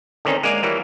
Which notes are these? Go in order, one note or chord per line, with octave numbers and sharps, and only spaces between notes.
D3 D#3 C4 C#4 D#4
G#3 A#3 D5 F5 G#5
E3 F#3 G3 A#3